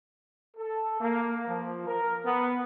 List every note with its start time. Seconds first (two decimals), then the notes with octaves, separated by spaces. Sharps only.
0.57 A4
1.00 A#3
1.48 F3
1.87 A#4
2.25 B3